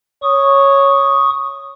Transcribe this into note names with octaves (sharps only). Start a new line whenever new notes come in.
C#5 C#6 D#6